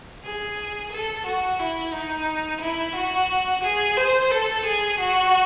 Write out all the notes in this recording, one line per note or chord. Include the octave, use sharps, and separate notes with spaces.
G#4
A4
F#4
E4
D#4
E4
F#4
G#4
C5
A4
G#4
F#4